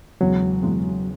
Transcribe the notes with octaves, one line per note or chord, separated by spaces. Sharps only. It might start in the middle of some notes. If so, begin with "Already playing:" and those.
E1 E2 C#3 F#3 G#3 C#4
E1 E2 C#3 G#3 C#4